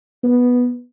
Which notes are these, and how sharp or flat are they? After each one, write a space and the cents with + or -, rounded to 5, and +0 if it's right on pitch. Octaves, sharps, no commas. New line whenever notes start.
B3 -5